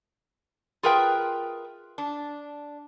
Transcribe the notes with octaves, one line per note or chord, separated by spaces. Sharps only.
F4 G#4 A#4 B4 E5 G5
D4